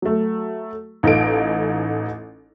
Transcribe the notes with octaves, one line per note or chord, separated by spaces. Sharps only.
F#3 A3
A1 D#4 F4 A4 D7